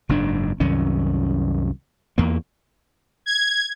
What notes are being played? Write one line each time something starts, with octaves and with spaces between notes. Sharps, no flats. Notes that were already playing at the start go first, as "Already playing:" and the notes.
F#1 G#2 D4
C2 F#2 D#3 C#4
E2 A#3
G#6